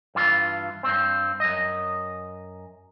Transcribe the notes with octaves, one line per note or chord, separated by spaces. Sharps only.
G2 E3 F4
G2 C4
F#2 D#5